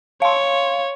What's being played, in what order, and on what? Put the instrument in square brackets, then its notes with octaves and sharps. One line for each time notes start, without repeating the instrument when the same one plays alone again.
[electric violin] C#5 [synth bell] F5 C6